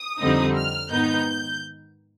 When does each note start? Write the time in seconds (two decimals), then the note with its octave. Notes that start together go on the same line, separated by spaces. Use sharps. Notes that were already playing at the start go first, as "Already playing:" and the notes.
Already playing: D#6
0.21 F2 D3 G3 C4 D#4
0.56 F6
0.91 G#2 D#3 B3 D#4 G6